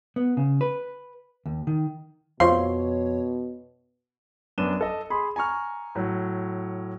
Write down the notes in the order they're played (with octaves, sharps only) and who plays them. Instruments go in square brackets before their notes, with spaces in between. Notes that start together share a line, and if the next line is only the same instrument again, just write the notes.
[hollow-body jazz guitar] B3
C#3
B4
D#2
D#3
[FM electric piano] F2 C#5 [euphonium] B2 [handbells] F4 C5 F5 [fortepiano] C6
[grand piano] F#2 B3 D4 D#7 E7 G7
A4 D#5
G#4 B5 C6
G#5 A#5 C#6 F6
A2 F#3